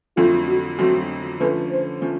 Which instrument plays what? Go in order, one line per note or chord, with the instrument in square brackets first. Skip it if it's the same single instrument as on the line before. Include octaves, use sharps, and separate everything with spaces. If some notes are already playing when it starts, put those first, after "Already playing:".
[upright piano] F2 D3 F#3 A3 C4 [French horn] F4
[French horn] F#4
[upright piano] F2 D3 F#3 A3 C4 [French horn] F#4
[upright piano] D3 F3 A3 C#4 [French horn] B4
[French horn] C5
[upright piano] D3 F3 A3 C#4